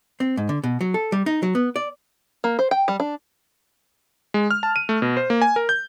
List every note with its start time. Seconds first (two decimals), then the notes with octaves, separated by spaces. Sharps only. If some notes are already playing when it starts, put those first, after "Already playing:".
0.20 C4
0.37 G#2
0.49 D3
0.64 B2
0.81 F#3
0.94 A4
1.12 G3
1.26 D#4
1.43 F#3
1.55 B3
1.76 D5
2.44 A#3
2.59 C5
2.71 G5
2.88 G3
3.00 D4
4.34 G#3
4.51 F6
4.63 A5
4.76 D#7
4.89 A3
5.02 B2
5.17 C5
5.30 A#3
5.42 G#5
5.56 A#4
5.69 G6